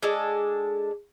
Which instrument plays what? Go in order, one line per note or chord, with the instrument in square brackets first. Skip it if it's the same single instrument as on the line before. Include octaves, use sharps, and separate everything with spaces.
[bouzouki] G#3 D4 A4